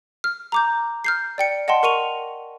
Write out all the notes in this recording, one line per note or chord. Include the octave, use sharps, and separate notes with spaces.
F6
A#5 D6 G6
F6 G6 C7
D5 G5 C#7
D#5 F#5 G5 A5 C6
A#4 C#6 D#7 F7